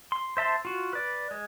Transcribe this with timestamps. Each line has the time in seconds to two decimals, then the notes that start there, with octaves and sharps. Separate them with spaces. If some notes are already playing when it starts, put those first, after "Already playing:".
0.12 C6
0.37 C5 E5 A5 C6
0.65 F4 F#4
0.93 B4 D5
1.31 G#3